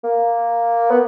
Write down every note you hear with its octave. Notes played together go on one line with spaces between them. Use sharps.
A#3
B3